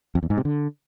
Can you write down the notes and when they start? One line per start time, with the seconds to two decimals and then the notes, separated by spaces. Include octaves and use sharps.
0.15 F2
0.23 E2
0.30 G#2
0.38 C3
0.45 D3